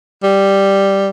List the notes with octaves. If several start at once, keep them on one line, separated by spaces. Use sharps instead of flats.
G3